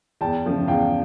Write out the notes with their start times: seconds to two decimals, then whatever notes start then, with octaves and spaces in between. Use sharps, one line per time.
0.21 E2 G5 A5
0.45 C#3 F3 A3
0.67 E2 F5 G5